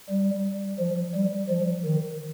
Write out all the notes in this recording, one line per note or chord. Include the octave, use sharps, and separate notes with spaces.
G3
F3
G3
F3
D#3